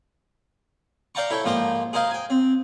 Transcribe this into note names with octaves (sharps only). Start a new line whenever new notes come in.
D5 F5 G5 A5 A#5 C#6
E4 A4 C#5 G5 C#6
G#2 F3 A#3 C5 G5
G#4 A#4 C5 D#5 F5
G5 G#5
C4